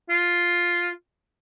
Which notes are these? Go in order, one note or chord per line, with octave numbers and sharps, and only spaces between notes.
F4